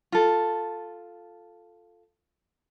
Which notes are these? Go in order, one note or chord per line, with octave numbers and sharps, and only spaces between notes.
F4 A4